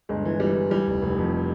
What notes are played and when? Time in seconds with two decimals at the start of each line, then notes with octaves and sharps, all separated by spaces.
0.09 G1 G#3
0.25 E3
0.40 E3 G3
0.56 E3
0.71 E3 G3
0.87 F1
1.02 F1
1.18 F2